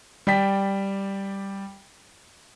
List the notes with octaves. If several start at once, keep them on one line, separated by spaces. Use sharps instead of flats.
G3 D5 G5 B6